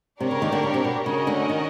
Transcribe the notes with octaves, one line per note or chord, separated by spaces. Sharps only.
C3 D4 G4 A#4 C#5
C#3
D#2 D#3
D2 D3
C#3
C3
B2
C#3 C#4 F#4 A#4 D#5
D2 D3
D#3